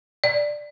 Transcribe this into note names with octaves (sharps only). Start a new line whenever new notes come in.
D5